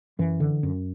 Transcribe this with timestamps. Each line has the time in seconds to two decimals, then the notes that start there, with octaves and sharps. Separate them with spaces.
0.19 F#2 E3
0.40 D3
0.63 F#2